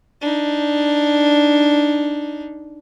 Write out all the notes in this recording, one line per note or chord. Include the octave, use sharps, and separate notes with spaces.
D4 D#4